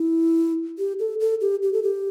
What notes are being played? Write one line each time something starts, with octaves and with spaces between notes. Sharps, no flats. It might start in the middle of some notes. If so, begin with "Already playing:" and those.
Already playing: E4
G4
A4
A4
G4
G4
A4
G4